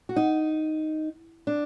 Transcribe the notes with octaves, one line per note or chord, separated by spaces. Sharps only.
F#4
D#4
D4